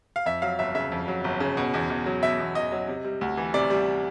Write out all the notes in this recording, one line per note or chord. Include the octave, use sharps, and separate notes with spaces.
F5
F2 E5
F#3 F5
G1 E5
C#3 E5
F2
F#3
G1
C#3
B2
E2
E2
F#3
B2 E5
E2
E2 D#5
F#3
C3
G3
D2
E3
C3 D5
G3